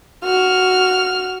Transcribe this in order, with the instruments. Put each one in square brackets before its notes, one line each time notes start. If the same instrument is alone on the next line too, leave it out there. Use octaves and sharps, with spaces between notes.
[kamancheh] F#4 F6